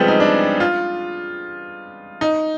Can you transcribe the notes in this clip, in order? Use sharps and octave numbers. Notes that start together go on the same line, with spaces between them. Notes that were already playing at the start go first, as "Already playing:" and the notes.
Already playing: F3 G3 G#3 B3 C4
D#4
D4
F4
D#4